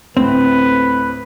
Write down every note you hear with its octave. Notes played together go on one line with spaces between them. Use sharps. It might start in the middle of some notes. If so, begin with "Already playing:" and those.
D2 A2 C4 B4